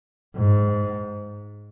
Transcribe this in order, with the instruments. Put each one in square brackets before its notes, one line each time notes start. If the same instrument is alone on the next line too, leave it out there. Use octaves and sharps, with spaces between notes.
[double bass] G#2